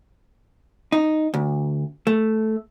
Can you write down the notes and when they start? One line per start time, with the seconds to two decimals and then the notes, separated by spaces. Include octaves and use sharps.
0.92 D#4
1.34 D2
2.07 A3